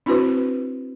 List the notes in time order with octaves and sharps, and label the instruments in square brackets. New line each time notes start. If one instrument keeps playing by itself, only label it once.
[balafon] C4 D4 E4 F#4 B4 C5